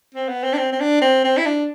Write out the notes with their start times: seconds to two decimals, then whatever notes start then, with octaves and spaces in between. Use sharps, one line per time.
0.15 C4
0.29 B3
0.43 C4
0.53 D4
0.58 C4
0.72 C4
0.80 D4
1.02 C4
1.24 C4
1.37 E4
1.46 D4